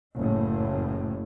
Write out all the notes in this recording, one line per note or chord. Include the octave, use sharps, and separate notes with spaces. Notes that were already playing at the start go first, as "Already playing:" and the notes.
F#1 A2